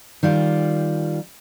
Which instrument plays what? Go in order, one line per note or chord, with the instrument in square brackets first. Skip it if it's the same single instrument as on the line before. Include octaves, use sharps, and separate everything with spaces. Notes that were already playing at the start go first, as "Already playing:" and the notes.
[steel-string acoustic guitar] D#3 G3 F4 D5